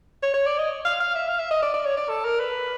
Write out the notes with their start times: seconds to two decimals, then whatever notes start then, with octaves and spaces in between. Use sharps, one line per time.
0.22 C#5
0.34 C#5
0.46 D5
0.58 D#5
0.85 F5
1.00 F5
1.15 E5
1.28 F5
1.39 E5
1.51 D#5
1.62 D5
1.74 D5
1.85 C#5
1.97 D5
2.09 A4
2.25 A#4
2.40 B4